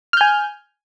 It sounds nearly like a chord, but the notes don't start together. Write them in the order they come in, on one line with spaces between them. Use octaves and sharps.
F6 G6 G#5